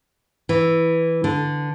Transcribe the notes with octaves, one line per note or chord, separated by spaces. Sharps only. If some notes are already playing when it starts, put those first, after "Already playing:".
E3
D3